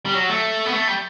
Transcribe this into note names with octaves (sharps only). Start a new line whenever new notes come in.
G3
F#3
A3
B3
A3
G3